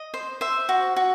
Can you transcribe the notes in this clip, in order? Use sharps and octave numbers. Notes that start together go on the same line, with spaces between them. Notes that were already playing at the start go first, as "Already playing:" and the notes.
Already playing: D#5
C5
C5 E5
F#4
F#4